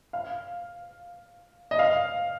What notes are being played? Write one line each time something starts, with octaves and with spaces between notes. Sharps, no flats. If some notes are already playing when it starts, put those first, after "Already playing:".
F5
D#5
F5